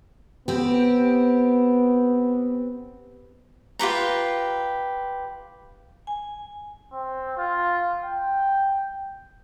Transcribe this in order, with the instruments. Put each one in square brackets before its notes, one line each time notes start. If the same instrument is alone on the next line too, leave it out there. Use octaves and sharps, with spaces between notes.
[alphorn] B3 [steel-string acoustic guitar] C4 G4
[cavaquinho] F4 G4 B4 A#5
[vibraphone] G#5
[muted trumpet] C4
F4
G5